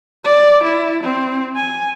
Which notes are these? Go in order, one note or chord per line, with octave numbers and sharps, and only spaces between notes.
D5
E4
C4
G#5